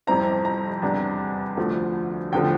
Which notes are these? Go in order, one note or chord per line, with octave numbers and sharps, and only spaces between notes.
F2 C3 G3 C4 E4 A#5
A#5
E2 C3 G3 D4
D2 D3 F3 A3
E2 D3 F3 A3 G5